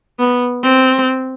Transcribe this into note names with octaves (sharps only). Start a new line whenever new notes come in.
B3
C4